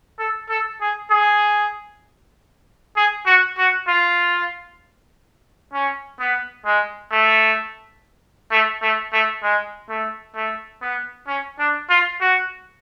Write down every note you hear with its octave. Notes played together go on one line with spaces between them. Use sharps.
A4
A4
G#4
G#4
G#4
F#4
F#4
F4
C#4
B3
G#3
A3
A3
A3
A3
G#3
A3
A3
B3
C#4
D4
F4
F#4